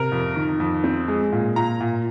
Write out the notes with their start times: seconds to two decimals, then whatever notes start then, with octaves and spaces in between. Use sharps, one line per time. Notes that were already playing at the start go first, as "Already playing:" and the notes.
Already playing: C3 A#4
0.12 F2
0.36 D#3
0.60 F2
0.84 C4
1.08 G#3
1.32 A#2
1.56 A#2 A#5
1.81 A#2